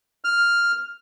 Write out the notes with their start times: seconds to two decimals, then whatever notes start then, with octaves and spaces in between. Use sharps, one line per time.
0.24 F6